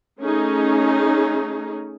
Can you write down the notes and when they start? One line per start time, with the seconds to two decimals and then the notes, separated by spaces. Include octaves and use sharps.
0.20 A3 C#4 D#4 G#4